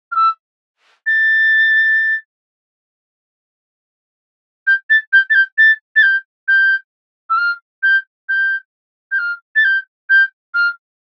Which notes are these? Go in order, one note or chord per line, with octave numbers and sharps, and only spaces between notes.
F6
E6
A6
G6
A6
G6
A6
G6
A6
A6
G6
G6
E6
F6
G6
G6
G6
F6
A6
G6
G6
F6